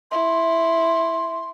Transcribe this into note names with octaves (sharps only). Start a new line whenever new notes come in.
E4 C6